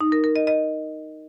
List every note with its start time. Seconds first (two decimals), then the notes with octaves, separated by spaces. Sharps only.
0.01 D#4
0.12 A#4
0.24 A#4
0.36 D#5
0.47 D#5